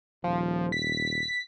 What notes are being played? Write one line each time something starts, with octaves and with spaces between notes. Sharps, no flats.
D#1 F3
B6